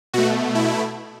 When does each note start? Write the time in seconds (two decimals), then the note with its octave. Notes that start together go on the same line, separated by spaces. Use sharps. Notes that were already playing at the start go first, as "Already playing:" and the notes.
0.13 B2 A3 F#4
0.55 E4